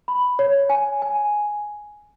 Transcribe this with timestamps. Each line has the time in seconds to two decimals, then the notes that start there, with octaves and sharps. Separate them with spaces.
0.08 B5
0.39 C#5
0.69 G#5
1.02 G#5